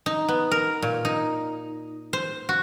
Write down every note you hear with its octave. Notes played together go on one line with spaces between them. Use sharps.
D#4
B3
A#4
A#2
D#4
C5
F#4